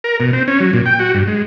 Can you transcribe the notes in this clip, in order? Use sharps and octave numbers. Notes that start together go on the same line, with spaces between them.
A#4
B2
C4
C#4
F#3
A#2
G5
F#4
G2
G#3